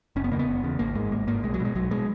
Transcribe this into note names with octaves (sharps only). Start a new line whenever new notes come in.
F#1 C#4
B3
E2 C#3 A#3
B3
F#1
E2 C#3
G#1 A#3
G#2 G#3
G#1 A#3
G#2 A#3
B1 G#3
F#3
B2 G#3
B1 F#3
B2 G#3